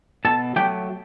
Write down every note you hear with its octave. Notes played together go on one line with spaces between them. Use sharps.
B2 A4 A5
F#3 A3 G4 G5